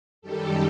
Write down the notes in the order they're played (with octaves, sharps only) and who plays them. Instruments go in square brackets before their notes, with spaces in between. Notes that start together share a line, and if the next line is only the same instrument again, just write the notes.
[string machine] F#2 D#3 G3 G4 A4